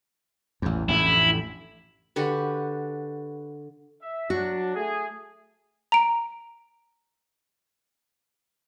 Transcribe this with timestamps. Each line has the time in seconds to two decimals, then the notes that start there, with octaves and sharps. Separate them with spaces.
0.62 A1 E2
0.89 A1 F2 D3 E4
2.16 D3 F#4 G4 B4
4.01 E5
4.30 F#3 D4 F#4
4.75 A3 G#4
5.92 A#5 D7